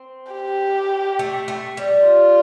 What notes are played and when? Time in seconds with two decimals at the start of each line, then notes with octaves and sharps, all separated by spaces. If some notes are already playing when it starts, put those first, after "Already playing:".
Already playing: C4
0.32 G4
1.19 A3
1.48 A3
1.77 G3
2.06 F4